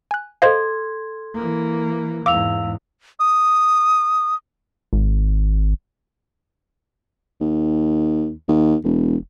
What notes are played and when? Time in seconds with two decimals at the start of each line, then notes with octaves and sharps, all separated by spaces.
0.11 G#5 F#6
0.42 A4 C5 D#5 F5 C6 G#6
1.34 E3 A#3
2.26 E2 G#2 F5 D6 E6 F7
3.19 D#6
4.93 G#1
7.41 D#2
8.49 D#2
8.84 E1